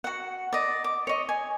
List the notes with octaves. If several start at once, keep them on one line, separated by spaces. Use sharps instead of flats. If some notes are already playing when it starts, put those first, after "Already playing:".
F#4 F#5
D5 D#5
D6
C#5 D#5
G#5